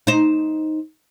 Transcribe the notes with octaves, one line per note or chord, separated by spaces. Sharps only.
D#4 C5